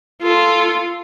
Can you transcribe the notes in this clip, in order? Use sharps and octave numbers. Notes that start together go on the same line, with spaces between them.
F4 A4